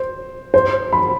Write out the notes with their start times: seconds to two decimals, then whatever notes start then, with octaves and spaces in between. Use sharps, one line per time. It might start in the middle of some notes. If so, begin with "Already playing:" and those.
Already playing: C5
0.54 C5
0.93 B5